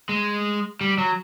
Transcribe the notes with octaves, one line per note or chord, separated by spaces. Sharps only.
G#3
G3
F#3